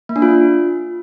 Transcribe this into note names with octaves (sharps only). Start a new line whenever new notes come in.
A#3
D4
F4